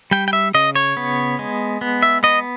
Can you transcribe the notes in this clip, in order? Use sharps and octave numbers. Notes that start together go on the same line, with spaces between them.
G3 G5
G5
E5
C#3 D#5
C#5
B3
G#3
B3
E5
B3 D#5